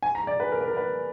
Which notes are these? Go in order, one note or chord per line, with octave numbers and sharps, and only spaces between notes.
G#5
A#5
D5
B4
A#4
B4
A#4
B4